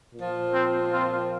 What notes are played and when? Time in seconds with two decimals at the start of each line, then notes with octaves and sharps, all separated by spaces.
0.15 A#2 F3
0.53 C4
0.92 C4 F4